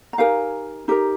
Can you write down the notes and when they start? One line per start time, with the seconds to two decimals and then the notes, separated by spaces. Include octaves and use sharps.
0.13 A#5
0.18 D#4 G4 A#4 F5 G#5
0.88 D#4 G4 A#4